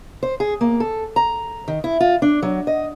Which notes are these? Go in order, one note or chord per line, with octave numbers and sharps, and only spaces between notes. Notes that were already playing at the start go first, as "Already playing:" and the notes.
C5
G#4
A#3
A4
A#5
D#3
E4
F4
D4
F#3
D#5